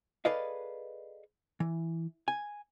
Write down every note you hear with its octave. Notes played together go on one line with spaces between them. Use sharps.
G#4 A4 B4 D5 D#5 F5
E3
G#5